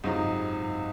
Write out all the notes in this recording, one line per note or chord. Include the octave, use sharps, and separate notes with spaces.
C#2 F#2 C3 F#3 C4 D#4
G#2
F#2
G#2